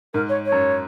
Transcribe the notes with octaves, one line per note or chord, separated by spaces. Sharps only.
G#2 A#4
C#5
C#5
F#2